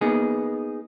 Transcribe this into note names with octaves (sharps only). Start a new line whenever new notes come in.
A#3 B3 D#4 G#4